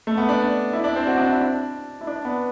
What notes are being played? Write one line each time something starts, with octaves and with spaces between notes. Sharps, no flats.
A3
B3
D4
E4
D4
C4
F#4
D4
E4
D4
E4
D4
B3